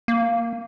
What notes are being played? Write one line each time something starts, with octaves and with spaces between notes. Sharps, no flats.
A#3